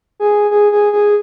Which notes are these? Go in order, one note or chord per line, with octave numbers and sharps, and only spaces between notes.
G#4
G#4
G#4
G#4